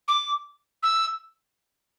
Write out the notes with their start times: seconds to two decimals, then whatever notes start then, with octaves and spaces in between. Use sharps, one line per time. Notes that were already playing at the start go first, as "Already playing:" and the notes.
0.08 D6
0.83 E6